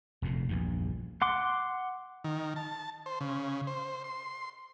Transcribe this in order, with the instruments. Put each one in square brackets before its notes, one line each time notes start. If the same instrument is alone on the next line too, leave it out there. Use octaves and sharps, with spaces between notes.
[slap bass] F1 F2 A#2
A#1 E2 G2
[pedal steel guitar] F#5 C6 D6
[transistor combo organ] D#3
A5
C5
C#3
C5
C6